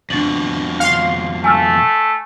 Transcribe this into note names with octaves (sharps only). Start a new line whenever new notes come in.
F2 B2 D4 A6 F#7
F5 C6 C#7
A3 G#5 E6 F6